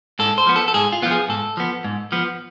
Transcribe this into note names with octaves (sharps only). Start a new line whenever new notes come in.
G#2 A4
C5
F3 B3
A4
A4
G#2 G#4
F4
F3 B3 F4
G#4
G#2 A4
F3 B3
G#2
F3 B3